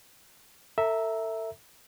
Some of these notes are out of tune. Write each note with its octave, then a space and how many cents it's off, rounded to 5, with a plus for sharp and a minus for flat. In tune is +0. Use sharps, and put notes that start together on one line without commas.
A4 +35 E5 -5 A#5 +0